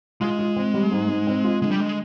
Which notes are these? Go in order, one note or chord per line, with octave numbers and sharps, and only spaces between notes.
G#3 F4
F4
C4
G3
G#2
G#2
C4
F4
D3 G#3
G3
G#3